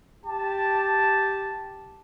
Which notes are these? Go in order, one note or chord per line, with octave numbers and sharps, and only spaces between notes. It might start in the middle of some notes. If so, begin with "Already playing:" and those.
G4 A5